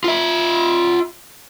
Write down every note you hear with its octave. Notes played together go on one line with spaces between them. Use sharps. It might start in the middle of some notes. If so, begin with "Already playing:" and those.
F4 E5